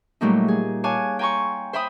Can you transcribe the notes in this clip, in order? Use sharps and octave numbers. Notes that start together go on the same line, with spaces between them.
A#2 F#3 G3 A3 D#4
G#4
C#5 F5 G#5 A5 D6 F#6
G5 G#5 A#5 C6 C#6
C5 E5 G5 B5 D#6